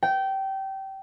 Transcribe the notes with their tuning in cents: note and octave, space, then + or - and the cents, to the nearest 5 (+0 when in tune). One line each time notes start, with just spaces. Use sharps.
G5 -20